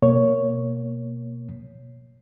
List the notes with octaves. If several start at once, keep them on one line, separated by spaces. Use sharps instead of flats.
B2 A#3 C#5